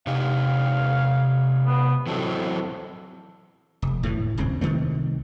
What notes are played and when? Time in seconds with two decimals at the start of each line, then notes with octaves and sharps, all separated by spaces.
0.07 C3 D#4 G4 F5
1.66 B3
2.07 E3 F#3 C4 A4
3.82 F1
4.03 A2 D3 E3
4.38 D#1 C#2 G2 C4
4.61 C2 D#3 A3 C4